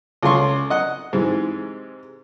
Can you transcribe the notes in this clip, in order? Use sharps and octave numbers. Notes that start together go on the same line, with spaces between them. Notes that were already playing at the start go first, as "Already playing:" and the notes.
C#2 F4 A4 C6 C#6
D#5 F#5
G#2 C3 E3